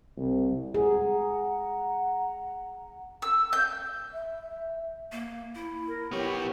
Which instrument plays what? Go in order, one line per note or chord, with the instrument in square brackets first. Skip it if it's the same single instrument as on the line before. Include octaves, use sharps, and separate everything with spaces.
[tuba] C2
[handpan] G#4 [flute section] F#5 A#5
[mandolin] E6
G6
[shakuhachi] E5
[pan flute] A#3
E4
[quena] A#4
[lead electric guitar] B3 C#5 [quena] G4